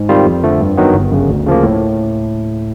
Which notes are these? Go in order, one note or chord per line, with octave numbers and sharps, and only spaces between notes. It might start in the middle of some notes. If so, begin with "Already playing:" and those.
Already playing: G#2
D#3 G3 C4 F4
F2
D3 F3 A3
G2
D#3 F#3 B3
G1
F#2 C#3
D2
C#3 F3 A#3
A2